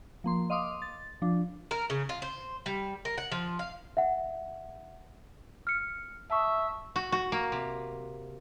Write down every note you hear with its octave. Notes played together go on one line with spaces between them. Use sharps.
F3 A#3 C6
D#5 F5 C6 D6 D#6
A6
F3 D4
A#4
C#3
F4
C5
G3
A#4
F#5
F3
F5
E5 F#5
F6 C#7
E5 A5 C#6 D#6
F#4
F#4
A#3
C3